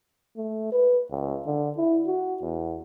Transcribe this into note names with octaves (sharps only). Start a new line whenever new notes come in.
A3
B4
C#2
D3
E4
F#4
E2